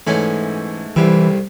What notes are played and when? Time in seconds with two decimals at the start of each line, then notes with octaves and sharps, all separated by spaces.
0.07 G#2 E3 A3 C#4
0.96 C2 C3 E3